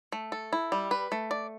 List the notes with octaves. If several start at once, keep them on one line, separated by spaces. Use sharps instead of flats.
A3
A4
E4
G3
B4
A3
D5